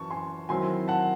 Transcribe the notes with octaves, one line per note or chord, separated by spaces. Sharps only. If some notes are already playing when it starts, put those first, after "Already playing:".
Already playing: F#2 E3 A5 C#6
G#5 C6
D#3 F#3 C4 E4 G#5 C6
F#5 A5